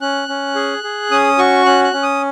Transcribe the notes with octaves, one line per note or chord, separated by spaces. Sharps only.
C#4 F#6
C#4
G#4
G#4
C#4 D#6
F#4 C#6
C#4 F#6
F#6
C#4
D#6